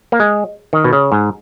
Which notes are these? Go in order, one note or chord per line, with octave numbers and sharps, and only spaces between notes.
A#3
G#3
D#3
B2
C#3
G#2